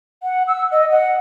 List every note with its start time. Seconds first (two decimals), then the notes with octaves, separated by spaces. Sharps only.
0.23 F#5
0.48 E6
0.72 D#5
0.91 F#5